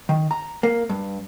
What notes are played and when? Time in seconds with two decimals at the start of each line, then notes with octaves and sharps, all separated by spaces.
0.09 D#3
0.31 A#5
0.63 A#3
0.89 G2